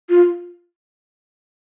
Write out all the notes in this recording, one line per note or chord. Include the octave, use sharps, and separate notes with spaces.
F4